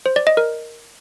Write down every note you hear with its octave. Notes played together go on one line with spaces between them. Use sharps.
C5
D5
D#5
A#4